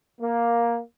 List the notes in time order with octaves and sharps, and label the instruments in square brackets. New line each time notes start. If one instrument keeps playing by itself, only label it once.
[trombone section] A#3